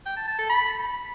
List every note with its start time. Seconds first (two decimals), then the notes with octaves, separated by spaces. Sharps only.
0.06 G5
0.17 A5
0.27 A5
0.38 A4
0.49 B5